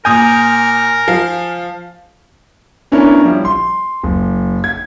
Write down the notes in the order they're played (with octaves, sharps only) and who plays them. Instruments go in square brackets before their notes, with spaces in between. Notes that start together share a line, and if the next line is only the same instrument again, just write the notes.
[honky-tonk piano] A#2 D#6 G6 [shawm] A#4 [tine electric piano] G#5
[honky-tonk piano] F3 F5
[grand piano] B3 C#4 D4 E4 A#4
F3 G3 E4
C6
F#1
G#6